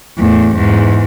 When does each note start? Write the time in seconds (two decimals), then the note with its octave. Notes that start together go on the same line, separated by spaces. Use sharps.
0.18 E2 A2
0.56 E2 G#2